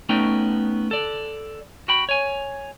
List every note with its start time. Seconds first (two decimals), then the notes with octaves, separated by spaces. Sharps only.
0.09 A3 B3 C#4 D#4 G5
0.91 A4 D5
1.88 F#4 G5 B5
2.09 C#5 G#5